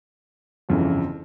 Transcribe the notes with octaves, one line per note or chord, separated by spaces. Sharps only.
G1 F2 C#3 E3